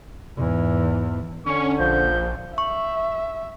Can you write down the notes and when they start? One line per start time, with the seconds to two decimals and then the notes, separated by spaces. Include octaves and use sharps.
0.37 E2 G#2
1.46 D3 C#4 C#6
1.79 A#1 F3 G6
2.58 E5 C#6